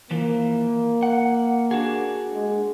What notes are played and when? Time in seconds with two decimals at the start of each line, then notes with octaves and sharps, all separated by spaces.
0.11 E3 F3 A#3
1.03 F#5
1.71 D4 F#4 G#4
2.33 G#3